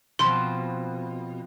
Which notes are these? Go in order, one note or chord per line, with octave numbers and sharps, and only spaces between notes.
B2 F3 C4 C6